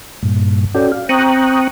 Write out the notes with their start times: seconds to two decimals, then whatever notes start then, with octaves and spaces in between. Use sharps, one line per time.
0.23 G2 A#2
0.75 C#4 F#4 A4 D5 G5
0.92 F5
1.09 C4 G5 A#5 C#6 D#6 F#6